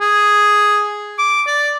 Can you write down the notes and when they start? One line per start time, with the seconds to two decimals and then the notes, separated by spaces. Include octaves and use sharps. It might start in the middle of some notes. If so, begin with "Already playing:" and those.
0.01 G#4
1.19 D6
1.47 D5